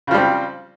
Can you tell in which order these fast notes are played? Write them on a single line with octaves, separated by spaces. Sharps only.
C#3 F3 G3 C4